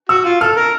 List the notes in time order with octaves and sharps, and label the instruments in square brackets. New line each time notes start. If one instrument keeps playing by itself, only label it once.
[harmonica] F#4 [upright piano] E6
[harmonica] F4
[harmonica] A4 [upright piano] F6
[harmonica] A#4